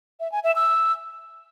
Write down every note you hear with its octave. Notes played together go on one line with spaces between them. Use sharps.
E5
G#5
E5
E6